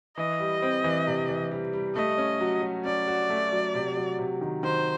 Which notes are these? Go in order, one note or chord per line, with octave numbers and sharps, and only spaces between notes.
E3 D#5
G3
C4
E3
C3
E3
G3
G3
A3 D#5
C#4
F#3
F#3
C#4 D5
F#4
A3
F#3
C3
F#3
C3
D#3
D#3 C5